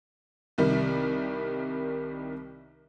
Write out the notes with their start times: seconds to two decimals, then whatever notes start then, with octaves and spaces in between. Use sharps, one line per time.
0.58 C2 C3 D#3 G3